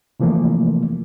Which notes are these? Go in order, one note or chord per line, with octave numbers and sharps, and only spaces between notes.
C3 E3 F3 A3 A#3